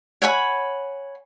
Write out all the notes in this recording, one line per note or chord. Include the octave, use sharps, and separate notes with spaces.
C#5 F#5 G#5 B5